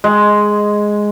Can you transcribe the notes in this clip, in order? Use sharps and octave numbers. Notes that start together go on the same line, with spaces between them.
G#3